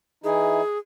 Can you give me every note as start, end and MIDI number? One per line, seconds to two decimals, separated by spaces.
0.24 0.61 52
0.24 0.61 63
0.24 0.61 64
0.24 0.78 68